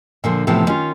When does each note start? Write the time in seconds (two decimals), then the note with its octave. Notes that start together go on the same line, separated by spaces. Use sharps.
0.24 A#2 D3 F3
0.47 A2 C3 E3 F3 B3 A5
0.67 D#3 C#4 F4